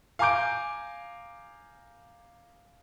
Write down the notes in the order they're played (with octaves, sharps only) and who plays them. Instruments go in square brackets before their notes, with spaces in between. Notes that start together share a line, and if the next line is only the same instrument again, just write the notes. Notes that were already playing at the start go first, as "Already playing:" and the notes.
[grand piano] F5 G#5 A#5 D6 G6 D7